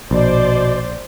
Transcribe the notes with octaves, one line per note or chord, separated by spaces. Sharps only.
A#1 B2 C5 D5